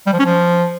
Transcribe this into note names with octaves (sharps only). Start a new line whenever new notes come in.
G3
F3
C#4
F3